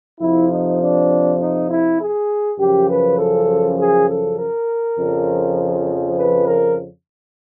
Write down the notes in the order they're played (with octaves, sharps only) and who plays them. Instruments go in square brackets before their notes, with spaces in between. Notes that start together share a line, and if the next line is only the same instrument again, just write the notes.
[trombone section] F2 C3 F3 E4
D#4
D4
D#4
E4
G#4
F#2 C#3 F3 G4
B4
A4
G#4
A4
A#4
F2 C#3 F3
B4
A#4